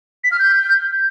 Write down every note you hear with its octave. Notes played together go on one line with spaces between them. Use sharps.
B6
F6
G6